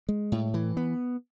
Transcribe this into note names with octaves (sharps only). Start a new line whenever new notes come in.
G#3
A2
E3
B3